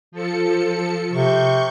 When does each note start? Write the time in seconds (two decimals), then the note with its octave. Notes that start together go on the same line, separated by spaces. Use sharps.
0.12 F3 A4 C#7
1.11 C3 C#6 G6